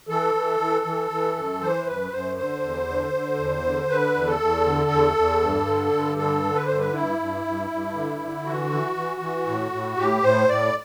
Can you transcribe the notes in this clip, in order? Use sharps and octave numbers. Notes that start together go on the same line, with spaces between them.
E3 A4
E3
E3
E3
E3
F#2
E3 C5
F#2 B4
F#2 C5
D3 C5
E2
D3
D3
E2
D3
D3 B4
E2
A4
E2
D3
E2
E2
G2
D3
G2
D3 A4
D3
B4
G2 C5
B4
G2 E4
G2
G2
G2
D3
D3
E3 F#4
E3
E3
E3
A2
A2
A2 G4
A2 C5
A2 D5